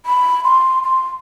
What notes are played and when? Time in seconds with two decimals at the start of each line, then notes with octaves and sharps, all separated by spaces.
0.06 B5
0.44 C6
0.83 C6